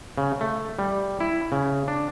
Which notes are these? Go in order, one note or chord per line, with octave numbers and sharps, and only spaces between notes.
C#3
A3
G3
E4
C#3
D4